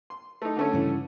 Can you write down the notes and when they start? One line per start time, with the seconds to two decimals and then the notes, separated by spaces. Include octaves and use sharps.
0.10 C6
0.42 A3 D#4
0.57 D3 A3 C#4
0.73 G2 C#3 E3